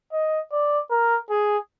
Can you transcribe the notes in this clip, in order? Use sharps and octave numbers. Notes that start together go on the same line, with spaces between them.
D#5
D5
A#4
G#4